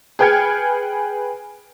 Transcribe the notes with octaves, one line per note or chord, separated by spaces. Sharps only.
G#4 B4 G5 F6 G#6 C#7